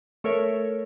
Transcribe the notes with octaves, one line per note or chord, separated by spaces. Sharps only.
A3 A4 A#4 C#5 E5